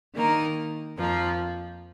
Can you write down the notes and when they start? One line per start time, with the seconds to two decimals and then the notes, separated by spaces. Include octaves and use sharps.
0.14 D#3 A#3 D#4 A#4
0.98 F2 F3 A#3 F4